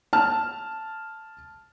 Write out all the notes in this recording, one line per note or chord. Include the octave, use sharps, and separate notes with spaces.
A5 F6